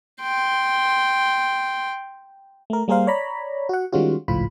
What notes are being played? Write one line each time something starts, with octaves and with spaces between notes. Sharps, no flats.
G5 C6
A3 A#4
G3 A#3 G#4 A#4 C5 F5
C#5 D5 A#5 B5
F#4 F#5
D#3 G3 G#3 C#4 F4 F#4
G#1 C#2 A2 F3 F4 B5